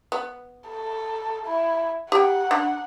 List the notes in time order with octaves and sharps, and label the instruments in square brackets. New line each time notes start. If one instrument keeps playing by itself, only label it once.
[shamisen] B3
[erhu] A4
E4
[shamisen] G4 G5 [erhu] F#5
[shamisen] D4